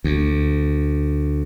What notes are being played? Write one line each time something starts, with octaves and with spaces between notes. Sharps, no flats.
D2